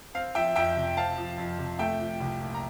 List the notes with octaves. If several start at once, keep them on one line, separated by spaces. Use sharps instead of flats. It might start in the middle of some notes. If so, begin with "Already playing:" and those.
C4 F5
F3 E5 G5
F2 E5 G5
C3
C4 F5 A5
F3
F2
C3
A3 E5 G5
F3
C2
A#2
A#5